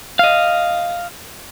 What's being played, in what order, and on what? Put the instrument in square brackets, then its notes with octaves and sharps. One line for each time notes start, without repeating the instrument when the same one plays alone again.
[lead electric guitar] D#5 F5